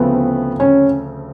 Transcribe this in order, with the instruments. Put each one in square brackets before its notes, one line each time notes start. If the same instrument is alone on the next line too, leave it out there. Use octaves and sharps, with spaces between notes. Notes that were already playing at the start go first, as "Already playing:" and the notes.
Already playing: [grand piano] D2 C#3 F3 A3 C4 [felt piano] B3
[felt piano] C#4